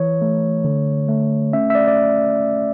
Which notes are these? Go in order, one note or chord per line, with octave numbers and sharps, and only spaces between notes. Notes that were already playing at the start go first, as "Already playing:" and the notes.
Already playing: E3 C#5
A3
D3
A3
C#4 E5
E5
D5
D5